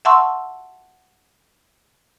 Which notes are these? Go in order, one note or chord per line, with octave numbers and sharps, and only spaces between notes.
E5 F#5 A5 C6 C#6 E6